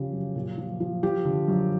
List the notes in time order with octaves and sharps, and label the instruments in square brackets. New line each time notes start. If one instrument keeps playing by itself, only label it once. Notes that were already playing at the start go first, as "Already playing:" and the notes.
Already playing: [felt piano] C#3 F3 G4
F#2
A#2
F3
F3
F3 G4
D3
F#2